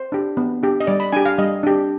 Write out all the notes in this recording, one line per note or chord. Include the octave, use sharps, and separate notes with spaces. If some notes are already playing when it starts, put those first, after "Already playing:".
Already playing: C5
D4 G4
B3
D4 G4
D#5
G3 D5
B5
D4 G4 G#5
F5
G3 D#5
D4 G4